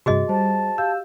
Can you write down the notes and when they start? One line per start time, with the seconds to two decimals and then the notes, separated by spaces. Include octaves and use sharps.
0.06 G2 C3 F#4 G#4 D#5
0.29 G3 C5 A5
0.78 G4 F5 E6 G6